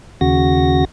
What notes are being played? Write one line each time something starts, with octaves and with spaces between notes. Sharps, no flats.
D#2 C#3 F#4 A#6